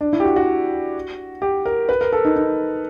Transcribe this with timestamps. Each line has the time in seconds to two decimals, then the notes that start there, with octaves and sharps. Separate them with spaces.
0.01 D4
0.13 E4
0.20 G4
0.25 F#4
0.36 F#4
1.42 G4
1.65 A#4
1.89 B4
2.01 A#4
2.12 A4
2.25 D#4
2.36 D#4